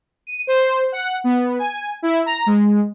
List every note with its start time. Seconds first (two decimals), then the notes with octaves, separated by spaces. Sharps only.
0.27 D#7
0.47 C5
0.92 F#5
1.24 B3
1.59 G#5
2.02 E4
2.26 A#5
2.46 G#3